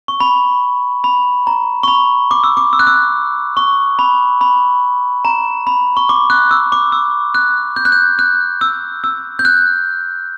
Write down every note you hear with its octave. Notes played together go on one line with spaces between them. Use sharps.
C#6
B5
B5
A#5
C#6
B5
D6
E6
D6
E6
F#6
E6
C#6
B5
B5
A#5
B5
C#6
D6
F#6
E6
D6
E6
F#6
G6
F#6
G6
F#6
E6
E6
G6
F#6